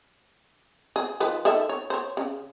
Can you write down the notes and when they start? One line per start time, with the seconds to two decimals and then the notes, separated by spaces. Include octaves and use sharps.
0.96 G#4
1.20 D#3 F3 B4
1.45 D#3 A4 E5
1.69 C#5
1.90 C5 C#5
2.17 C#3